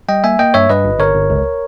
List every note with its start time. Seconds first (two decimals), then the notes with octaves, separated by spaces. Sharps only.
0.09 G3 D#5 G5
0.24 A#3 E5 G#5
0.39 A#3 D#5 G5
0.54 G2 C#5 E5
0.70 G2 B4 D#5
0.85 G1
1.00 G1 A#4 C#5
1.15 G1
1.30 C#2